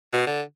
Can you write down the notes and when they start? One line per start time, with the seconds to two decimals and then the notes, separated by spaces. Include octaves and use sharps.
0.13 B2
0.27 D3